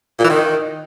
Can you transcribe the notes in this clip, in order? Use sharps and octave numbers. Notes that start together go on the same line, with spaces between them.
A#2
E3
D#3